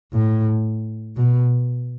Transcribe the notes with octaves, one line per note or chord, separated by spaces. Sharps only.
A2
B2